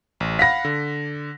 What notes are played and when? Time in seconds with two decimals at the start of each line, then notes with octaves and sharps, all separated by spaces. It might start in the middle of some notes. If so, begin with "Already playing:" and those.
0.20 A1
0.39 F5 F#5 B5 A#6 B6
0.65 D3